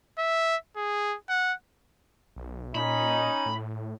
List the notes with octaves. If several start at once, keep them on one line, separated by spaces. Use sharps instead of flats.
E5
G#4
F#5
B1
A#2 C#4 D#4 B5
A2